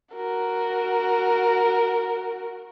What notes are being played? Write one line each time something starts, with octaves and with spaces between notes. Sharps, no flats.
F#4 A#4